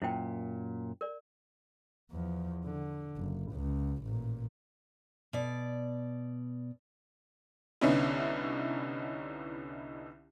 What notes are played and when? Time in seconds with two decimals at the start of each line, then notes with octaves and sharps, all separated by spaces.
0.02 F#2 A#2 E4 C5 G5
1.01 A#4 D5
2.11 E2 F3
2.65 D3
3.17 F#1
3.52 C#2
4.04 A1 A#2
5.33 B2 D5
7.81 C2 D3 B3 C#4 D#4 E4